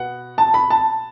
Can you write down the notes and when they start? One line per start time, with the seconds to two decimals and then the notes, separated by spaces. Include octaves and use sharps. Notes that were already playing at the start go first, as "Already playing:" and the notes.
Already playing: B2 B3 F#5
0.38 A5
0.54 B5
0.70 A5